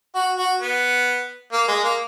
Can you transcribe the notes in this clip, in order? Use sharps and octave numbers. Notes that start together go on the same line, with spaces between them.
F#4
F#4
B3
A#3
G#3
A#3